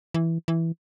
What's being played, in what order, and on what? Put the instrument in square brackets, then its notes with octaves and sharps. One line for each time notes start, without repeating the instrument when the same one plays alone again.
[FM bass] E3
E3